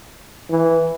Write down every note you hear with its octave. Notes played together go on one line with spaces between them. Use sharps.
E3